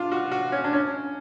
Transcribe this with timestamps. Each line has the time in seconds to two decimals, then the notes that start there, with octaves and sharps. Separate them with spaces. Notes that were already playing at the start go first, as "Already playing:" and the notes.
Already playing: D4 F4
0.12 F#4
0.31 F#4
0.52 C#4
0.64 D4
0.73 C#4